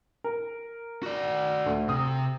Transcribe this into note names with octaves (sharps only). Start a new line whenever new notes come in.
A#4
F#4 D5
D2
C3 D#6